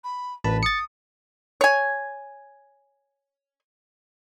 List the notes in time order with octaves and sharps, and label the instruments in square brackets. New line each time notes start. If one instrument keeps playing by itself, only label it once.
[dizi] B5
[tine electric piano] A1 A5 B5 [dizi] B4
[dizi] D#6 [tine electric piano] A6 C#7
[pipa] C#5 G#5